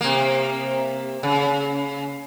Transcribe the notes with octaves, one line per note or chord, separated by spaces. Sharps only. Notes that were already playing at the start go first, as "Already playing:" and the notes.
C3 A#3
C#3